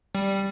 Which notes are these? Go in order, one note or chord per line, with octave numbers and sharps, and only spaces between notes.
G3